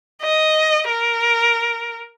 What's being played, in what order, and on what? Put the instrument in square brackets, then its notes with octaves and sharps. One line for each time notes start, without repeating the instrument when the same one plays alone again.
[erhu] D#5
A#4